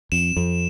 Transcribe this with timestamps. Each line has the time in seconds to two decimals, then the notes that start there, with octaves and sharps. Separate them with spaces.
0.12 F2 E7
0.37 F2